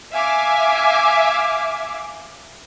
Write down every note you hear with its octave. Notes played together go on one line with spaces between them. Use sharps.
E5 F5 G#5 D6